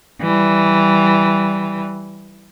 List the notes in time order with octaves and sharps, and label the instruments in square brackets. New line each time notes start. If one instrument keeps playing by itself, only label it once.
[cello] E3 G3